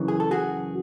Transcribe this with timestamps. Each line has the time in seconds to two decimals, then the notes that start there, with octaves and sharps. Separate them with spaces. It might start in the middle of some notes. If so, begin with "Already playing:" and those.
Already playing: F#2 C#3 E3
0.08 G#4
0.20 A4
0.31 F#4 G#4